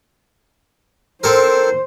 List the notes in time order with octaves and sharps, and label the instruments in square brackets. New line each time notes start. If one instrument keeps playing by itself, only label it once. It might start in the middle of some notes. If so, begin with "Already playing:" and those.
[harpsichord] C4 A4 A#4 [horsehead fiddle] C5